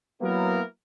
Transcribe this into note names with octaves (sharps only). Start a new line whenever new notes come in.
F#3 A#3 B3 E4 F#4 A#4